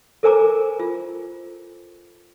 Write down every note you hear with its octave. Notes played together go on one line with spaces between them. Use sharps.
A4 A#4 C5 G#5 A#5 D6
F4